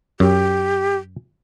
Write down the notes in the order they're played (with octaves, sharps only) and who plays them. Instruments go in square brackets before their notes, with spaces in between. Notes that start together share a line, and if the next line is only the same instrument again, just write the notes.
[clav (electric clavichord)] F#2 [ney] G4